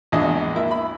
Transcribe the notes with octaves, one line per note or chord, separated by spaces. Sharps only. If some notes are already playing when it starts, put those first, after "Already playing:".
A#1 E2 G#3 D4 D#5
A#3 E4
B5